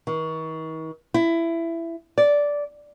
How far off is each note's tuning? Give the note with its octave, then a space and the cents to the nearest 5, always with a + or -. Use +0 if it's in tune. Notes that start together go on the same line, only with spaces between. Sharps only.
D#3 +45
E4 +15
D5 -10